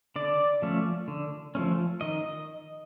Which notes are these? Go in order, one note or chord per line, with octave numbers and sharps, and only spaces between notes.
D3 D5
F3 A3 C#4
D3
F3 A3 C#4
D#3 D#5